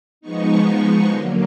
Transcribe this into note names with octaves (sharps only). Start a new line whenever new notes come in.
F3 G#3 B3 D#4 C#6
D3 F#3 A#3 C6